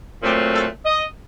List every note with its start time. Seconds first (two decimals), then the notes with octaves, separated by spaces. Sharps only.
0.21 A#2 F#3 A3 C4 G4
0.53 A4
0.85 D#5